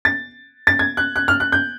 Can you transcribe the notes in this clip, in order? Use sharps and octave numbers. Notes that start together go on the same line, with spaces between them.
A6
A6
G#6
F#6
F#6
F6
F#6
G6